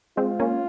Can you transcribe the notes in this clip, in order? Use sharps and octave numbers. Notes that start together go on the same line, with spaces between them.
G#3 C4 F4
A#3 C#4